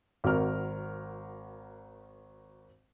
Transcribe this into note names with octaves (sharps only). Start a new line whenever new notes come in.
G#1 F#4 A#4 F6